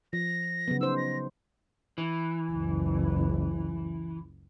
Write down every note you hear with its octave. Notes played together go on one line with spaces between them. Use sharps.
F3 A#6
C#3 F#3 B3
D#4 C5 E6
A#6
E3
F#1 C#2